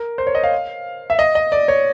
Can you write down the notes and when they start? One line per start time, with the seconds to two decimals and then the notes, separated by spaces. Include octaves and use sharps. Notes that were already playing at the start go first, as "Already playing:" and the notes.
Already playing: A#4
0.18 C5
0.27 C#5
0.35 D#5
0.43 F5
1.10 E5
1.19 D#5
1.35 D#5
1.52 D5
1.68 C#5